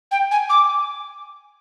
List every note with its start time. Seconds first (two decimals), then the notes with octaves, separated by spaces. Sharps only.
0.11 G5
0.31 G#5
0.50 D6